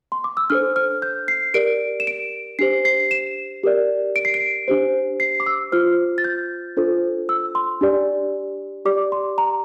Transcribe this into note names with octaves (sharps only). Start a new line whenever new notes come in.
C6
D6
E6
D4 A4 C5 F6
F6
G6
C7
G4 A#4 D5 D7
E7
D7
D4 G4 C5 C7
C7
E7
G4 A#4 D5
D7
C7
D7
D4 G4 C5
C7
D6
E6
F4 C5 F6
A6
G6
D4 F4 A4 C5
E6
C6
D4 G4 D5
G4 D5 D6
C6
A#5